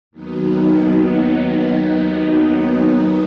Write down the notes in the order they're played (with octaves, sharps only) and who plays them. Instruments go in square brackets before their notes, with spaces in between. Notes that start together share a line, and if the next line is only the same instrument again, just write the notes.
[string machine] D#2 D#3 F#3 B3 D#4